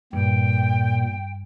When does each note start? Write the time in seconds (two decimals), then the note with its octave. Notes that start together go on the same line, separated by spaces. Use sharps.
0.13 G2 A#2 G5